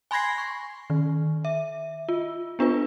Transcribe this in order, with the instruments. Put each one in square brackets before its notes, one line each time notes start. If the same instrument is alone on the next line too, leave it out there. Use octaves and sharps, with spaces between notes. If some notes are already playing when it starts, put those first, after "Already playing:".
[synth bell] G#5 B5 C6 G#6 A#6 C7
C#6
D#3
E5
F4
B3 D4 F4 B4